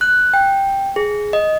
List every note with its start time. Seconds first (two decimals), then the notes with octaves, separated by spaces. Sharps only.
0.01 F#6
0.34 G5
0.96 G#4
1.33 D#5